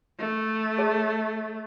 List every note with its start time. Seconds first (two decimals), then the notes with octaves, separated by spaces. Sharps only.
0.19 A3
0.78 G#4 C#5 A5